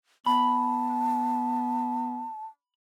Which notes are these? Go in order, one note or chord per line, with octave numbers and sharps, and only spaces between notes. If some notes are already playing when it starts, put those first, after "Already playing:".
B3 A5 B5